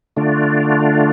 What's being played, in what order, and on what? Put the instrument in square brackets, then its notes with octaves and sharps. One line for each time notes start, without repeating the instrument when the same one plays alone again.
[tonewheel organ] D3 A3 D4 F4